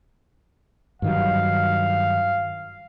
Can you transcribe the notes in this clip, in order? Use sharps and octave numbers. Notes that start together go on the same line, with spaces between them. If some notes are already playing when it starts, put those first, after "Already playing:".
G2 D#3 F#3 F5